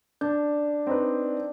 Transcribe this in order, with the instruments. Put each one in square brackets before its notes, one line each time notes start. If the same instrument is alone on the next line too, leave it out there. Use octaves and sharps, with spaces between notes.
[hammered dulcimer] D4 [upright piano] G6
[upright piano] C4 D#4 B4